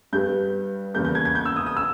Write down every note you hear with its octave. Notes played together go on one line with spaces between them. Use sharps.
G2 G3 B3 G6
E2 C#3 G3 A#3 G6
G6
G#6
G#6
G6
E6
D#6
D#6
E6